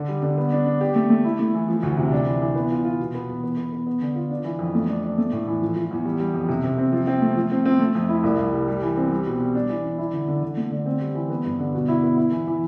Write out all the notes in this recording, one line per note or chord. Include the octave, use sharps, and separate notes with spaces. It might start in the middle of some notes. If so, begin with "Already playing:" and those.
Already playing: D3
G3
D3
B3
D4
D4
G4
A3
A3
E4
A3
E3
F3
D2
C3
D4
E3
E3
B3
F4
F4
B2
B3
E2
B3
B3
B3
B3
D3
F4
D4
E3
F2
A3
D4
D4
A3
A2
E3
F3
F3
E2
G3
G3
F2
C3
C3
C4
F3
C4
A3
F3
C4
C4
A3
F2
E4
C2
C2
G3
G3
E3
C4
G3
B2
G3
D4
E3
D4
E4
D3
D3
D3
A3
D3
C4
G3
E3
B3
G2
D3
B2
E4
B3
E4
E3
E3